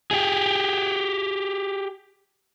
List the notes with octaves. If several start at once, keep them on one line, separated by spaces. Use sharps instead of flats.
G4 G#4